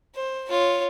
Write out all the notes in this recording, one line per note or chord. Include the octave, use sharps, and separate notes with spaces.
C5
F4 C#5